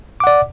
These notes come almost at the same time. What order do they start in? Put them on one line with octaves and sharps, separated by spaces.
D6 F#5 D5